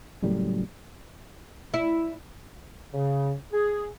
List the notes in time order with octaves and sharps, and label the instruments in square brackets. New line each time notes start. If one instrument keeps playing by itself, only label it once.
[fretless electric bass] F#1 F#2 A2 G3
[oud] E4
[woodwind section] C#3
G#4